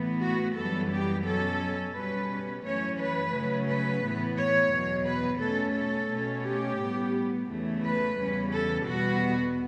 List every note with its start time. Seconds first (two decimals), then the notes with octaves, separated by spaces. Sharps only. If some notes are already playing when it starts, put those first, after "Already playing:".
Already playing: A2 E3 B3
0.22 F#4
0.56 F#2 E3 G3 B3 A4
0.92 G4
1.25 B2 F#3 C#4 A4
1.94 B2 G3 C#4 B4
2.64 F#2 E3 A3 C#4 C#5
2.99 B4
3.33 C#3 F#3 A3 C#4
3.68 B4
4.03 A2 E3 B3
4.37 C#5
4.71 E2 B2 F#3
5.06 B4
5.41 B2 A3 C#4 A4
5.75 A4
6.10 B2 A3 C#4
6.45 G4
6.79 A2 G3 B3
7.48 E2 C#3 E3 A3
7.83 B4
8.18 E2 C#3 G3 C#4
8.53 A4
8.87 E2 B2 G3 B3 F#4